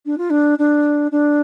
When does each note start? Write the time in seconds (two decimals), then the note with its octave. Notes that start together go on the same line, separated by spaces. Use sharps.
0.06 D4
0.18 F4
0.30 D4
0.58 D4
1.11 D4